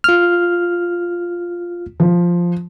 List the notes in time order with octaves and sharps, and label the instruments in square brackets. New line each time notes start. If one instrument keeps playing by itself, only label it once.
[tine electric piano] F4 F6
[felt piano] F3